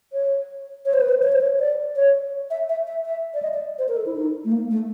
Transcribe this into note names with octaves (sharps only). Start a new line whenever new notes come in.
C#5
C#5
C5
B4
C5
C#5
C5
C#5
D5
C#5
E5
E5
E5
E5
D5
D#5
D5
C5
A#4
A4
E4
D#4
A3
A#3
A3